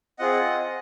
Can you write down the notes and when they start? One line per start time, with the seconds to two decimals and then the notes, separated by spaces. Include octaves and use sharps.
0.19 C4 F4 G#4 D#5 F#5